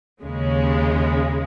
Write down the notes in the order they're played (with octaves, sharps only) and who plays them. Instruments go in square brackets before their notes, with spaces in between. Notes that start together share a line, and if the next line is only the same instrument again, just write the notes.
[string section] D#2 C#3 G#3